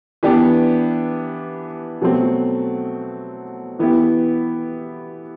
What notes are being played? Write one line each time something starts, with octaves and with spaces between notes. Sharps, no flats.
E3 B3 D4 G4
B2 F#3 A3 C4
E3 B3 E4 G4